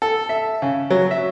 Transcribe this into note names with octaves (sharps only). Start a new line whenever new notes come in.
A4
E5
C#3
F#3
E5